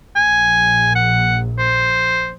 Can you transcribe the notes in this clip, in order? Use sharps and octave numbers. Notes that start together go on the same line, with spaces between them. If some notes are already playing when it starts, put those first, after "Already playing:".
A#1 G#5
F#5
C5